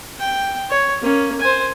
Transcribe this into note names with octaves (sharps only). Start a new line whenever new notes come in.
G5
C#5
A#3 C#4
C5 G#5